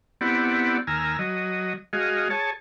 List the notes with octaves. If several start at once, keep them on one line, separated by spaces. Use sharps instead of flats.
B3 C4 E4 G4 D5 F#5
D#2 G#5 A#5 E6 F6
F#3 D#5
G#3 F#4 G#4 D#5 F5
G#4 C#5 A5